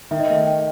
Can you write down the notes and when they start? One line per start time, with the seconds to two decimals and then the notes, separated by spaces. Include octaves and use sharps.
0.11 D#3 E5
0.20 D#5
0.30 A3 E5
0.47 G5